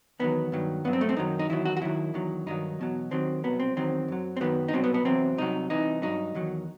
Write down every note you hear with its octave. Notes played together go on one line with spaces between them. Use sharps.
E2 D#3 F#3 B3
G2 D#3 F#3
G2 F#3 B3
C4
A3
C4
F#2 D#3 F#3 D#4
D#4
E2 D#3 F#3 E4
F#4
F#4
D#2 D#3 F#3 E4
E2 D#3 F#3
G2 D#3 F#3 D#4
E2 B2 F#3
D#2 D#3 F#3 C4
C2 B2 F#3 B3
C4
E2 D#3 F#3 C4
F#2 F#3
C4
F#2 D#3 F#3 B3
D#4
C2 B2 F#3 C4
B3
B3
E2 C3 F#3 C4
C2 C3 F#3 D#4
C2 C3 E3 D#4
G2 F#3 D#4
E2 D#3 F#3